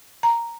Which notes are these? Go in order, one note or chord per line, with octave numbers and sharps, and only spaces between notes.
A#5